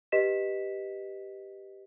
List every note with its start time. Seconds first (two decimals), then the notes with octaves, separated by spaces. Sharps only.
0.12 G4 B4 D#5 B6 E7